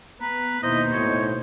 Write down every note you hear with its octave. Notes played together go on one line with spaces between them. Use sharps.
B3 B4 A#5
D#2 B2 D#4 E4 C5 D#5
A2 C#5